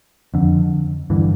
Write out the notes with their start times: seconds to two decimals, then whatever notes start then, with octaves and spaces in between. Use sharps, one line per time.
0.34 F2 D3
1.10 G2 D3 E3